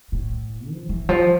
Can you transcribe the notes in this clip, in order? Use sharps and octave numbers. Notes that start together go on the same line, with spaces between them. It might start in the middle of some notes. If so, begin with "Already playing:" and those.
A2
F3
E3
F3